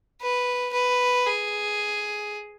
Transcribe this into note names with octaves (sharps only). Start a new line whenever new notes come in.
B4
B4
G#4